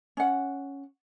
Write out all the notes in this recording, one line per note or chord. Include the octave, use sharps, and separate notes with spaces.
C#4 F#5